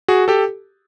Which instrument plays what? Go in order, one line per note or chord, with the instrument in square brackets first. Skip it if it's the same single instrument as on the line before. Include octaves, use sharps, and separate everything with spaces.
[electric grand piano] F#4 G#4
G4 A4